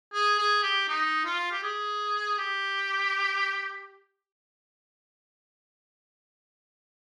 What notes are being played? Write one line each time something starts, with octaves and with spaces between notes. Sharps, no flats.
G#4
G#4
G4
D#4
F4
G4
G#4
G4